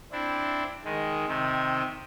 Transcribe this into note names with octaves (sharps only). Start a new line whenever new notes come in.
C4 D4 E4
D#3 G#3
C3 D#3 C4